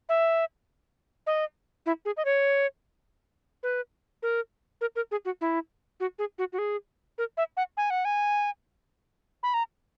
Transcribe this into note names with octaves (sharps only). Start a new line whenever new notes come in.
E5
D#5
E4
G#4
D#5
C#5
B4
A#4
A#4
A#4
G#4
F#4
E4
F#4
G#4
F#4
F#4
G#4
A#4
E5
F#5
G#5
F#5
G#5
B5
A#5